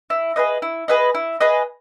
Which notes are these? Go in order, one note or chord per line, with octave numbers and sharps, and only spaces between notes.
E4
G#4 B4 D#5
E4
G#4 B4 D#5
E4
G#4 B4 D#5